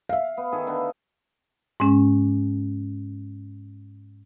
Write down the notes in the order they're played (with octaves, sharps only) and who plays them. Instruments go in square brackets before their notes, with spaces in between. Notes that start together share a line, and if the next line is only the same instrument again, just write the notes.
[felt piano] E5 F5
[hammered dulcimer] B3
D#3 G#4 A4
D3 B3
[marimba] G#2 G#3 C#4